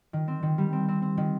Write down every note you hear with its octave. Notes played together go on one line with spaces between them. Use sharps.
D#3
C4
D#3
G3
C4
C4
C4
D#3